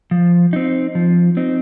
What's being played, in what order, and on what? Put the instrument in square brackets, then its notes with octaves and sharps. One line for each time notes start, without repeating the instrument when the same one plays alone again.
[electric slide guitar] F3
C4 D#4
F3
C4 D#4